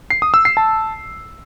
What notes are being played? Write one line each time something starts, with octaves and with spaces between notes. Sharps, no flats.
C7
D#6
E6
C7
A5